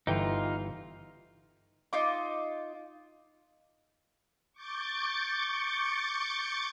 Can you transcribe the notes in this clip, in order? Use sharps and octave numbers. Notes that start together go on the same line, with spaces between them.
G1 E3 D#4 F4 G5
D#4 F4 D6
C#6 D6 G6 A6 C#7